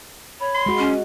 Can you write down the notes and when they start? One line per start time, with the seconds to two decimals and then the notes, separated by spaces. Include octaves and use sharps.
0.40 C#5 B5
0.54 C6
0.66 G#3 F#4
0.79 C#4